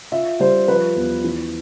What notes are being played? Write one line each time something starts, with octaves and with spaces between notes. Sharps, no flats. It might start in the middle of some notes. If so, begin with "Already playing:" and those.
F4 E5
G3 C5
F3 B4
E2
E3